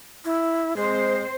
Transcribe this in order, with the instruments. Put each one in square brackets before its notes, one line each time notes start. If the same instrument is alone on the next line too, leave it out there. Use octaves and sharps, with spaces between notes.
[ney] E4
[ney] G#3 [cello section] C4 C5